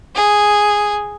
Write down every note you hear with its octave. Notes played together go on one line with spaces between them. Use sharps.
G#4